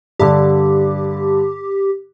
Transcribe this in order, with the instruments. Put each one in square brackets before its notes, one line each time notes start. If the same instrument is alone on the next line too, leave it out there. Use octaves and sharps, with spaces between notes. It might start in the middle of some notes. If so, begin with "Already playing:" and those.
[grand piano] G2 D3 [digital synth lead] G4